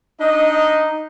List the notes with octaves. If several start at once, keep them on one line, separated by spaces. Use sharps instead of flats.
D4 D#4 D#5